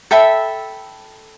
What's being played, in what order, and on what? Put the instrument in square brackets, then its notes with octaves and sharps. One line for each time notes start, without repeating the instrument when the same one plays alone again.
[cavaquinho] A4 E5 G5 B5